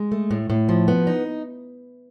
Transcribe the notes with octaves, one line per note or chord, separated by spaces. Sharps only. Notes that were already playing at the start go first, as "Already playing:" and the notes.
Already playing: G#3
A3
A2
A2
F3
B3
D#4